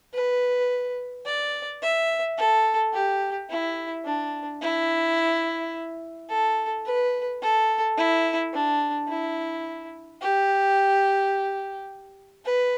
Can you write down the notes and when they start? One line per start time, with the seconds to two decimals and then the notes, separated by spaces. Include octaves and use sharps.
0.14 B4
1.26 D5
1.82 E5
2.37 A4
2.93 G4
3.50 E4
4.05 D4
4.61 E4
6.29 A4
6.86 B4
7.42 A4
7.97 E4
8.53 D4
9.09 E4
10.21 G4
12.45 B4